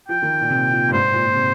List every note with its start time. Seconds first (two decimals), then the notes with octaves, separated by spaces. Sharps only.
0.08 F3 G5
0.22 D#3
0.41 A#2
0.50 C3
0.71 A#2
0.88 G2
0.93 G#2 C5
1.13 A#2
1.26 A#2
1.35 C3